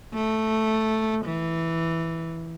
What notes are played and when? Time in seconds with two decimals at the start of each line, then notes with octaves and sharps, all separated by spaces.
0.14 A3
1.26 E3